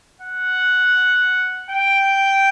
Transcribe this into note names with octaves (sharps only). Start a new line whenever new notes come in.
F#5
G5